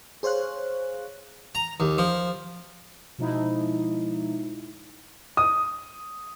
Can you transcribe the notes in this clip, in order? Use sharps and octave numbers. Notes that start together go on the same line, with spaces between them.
G#4 C5 C#5 F5 F#6
A#5
D#2
F3
B2 F3 G#3 D#4 E4
D#6